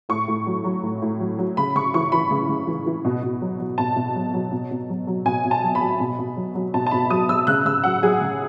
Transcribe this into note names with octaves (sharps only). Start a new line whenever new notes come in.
A2 C#6
A2
F#3
F#3
A2
A2
F#3
F#3
C#3 B5
C#3 C#6
E3 C#6
E3 B5
C#3
C#3
E3
E3
B2
B2
F#3
F#3
B2 A5
B2
F#3
F#3
B2
B2
F#3
F#3
B2 G#5
B2
A5
F#3
B5
F#3
B2
B2
F#3
F#3
B2 A5
A5
B2 B5
F#3 D#6
F#3 E6
C#3 F#6
C#3 E6
F#3 F#5
F#3 G#4
C#3